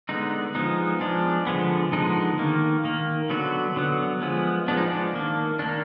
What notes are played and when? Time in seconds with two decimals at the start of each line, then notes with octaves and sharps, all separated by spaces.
0.09 D3 G#3 B3 D#4
0.55 F3 G#3 B3 D#4
1.01 F3 G#3 B3 D4
1.47 D3 F3 G#3 B3
1.92 D3 F3 G#3 B3 D#4
2.39 D#3 A#3
2.84 D#3 A#3
3.30 D3 F#3 B3 F#4
3.76 D3 F#3 B3
4.22 F3 G#3 B3
4.68 F3 G#3 B3 D4
4.77 D#4
4.88 D4
5.13 D#3 A#3
5.59 D#3 A#3 D4